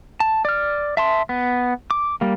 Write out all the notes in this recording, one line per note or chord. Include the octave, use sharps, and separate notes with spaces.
A5
D5 F6
E5 A5 C6
B3
D6
G3 A#3